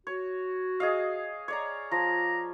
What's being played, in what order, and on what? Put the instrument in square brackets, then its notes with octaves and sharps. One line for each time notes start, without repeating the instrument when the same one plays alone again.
[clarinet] F#4 [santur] C#5
[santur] G#4 D#5 F5
C#5 D5 A#5
[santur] F3 [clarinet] A#5